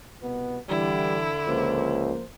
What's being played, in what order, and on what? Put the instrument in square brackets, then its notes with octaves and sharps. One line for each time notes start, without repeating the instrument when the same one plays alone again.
[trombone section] C2 B2 B3
[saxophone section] D3 [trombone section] E3 [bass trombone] G3 [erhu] E4
[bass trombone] C#2 [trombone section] F3 A#3 C5